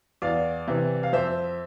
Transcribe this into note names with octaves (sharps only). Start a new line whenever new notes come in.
E2 D5 F5
C3 E3
F5
F2 C5 E5